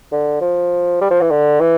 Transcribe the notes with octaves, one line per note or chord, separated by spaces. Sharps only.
D3
F3
G3
F3
E3
D3
E3